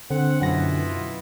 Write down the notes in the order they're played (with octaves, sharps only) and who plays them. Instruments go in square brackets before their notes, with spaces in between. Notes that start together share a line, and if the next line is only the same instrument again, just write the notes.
[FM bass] D3 [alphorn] C4 [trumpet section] F#5
[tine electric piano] F#2 A#6 [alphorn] B2 [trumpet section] B3 E4 F4
[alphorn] B2